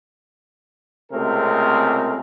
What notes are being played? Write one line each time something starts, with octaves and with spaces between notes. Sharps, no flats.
C#2 C3 A3 C4 G#4 A#4